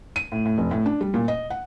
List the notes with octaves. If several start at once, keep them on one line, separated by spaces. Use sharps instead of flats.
D#7
A2
A2
F1
A2
D4
G3
A#2
D#5
F#5